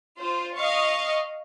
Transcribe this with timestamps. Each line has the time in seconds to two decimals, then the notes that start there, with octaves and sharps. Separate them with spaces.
0.19 F4 C5
0.56 D#5 F5 C#6